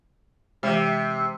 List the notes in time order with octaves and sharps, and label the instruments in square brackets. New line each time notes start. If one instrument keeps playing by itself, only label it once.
[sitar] C3 [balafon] E3 G#3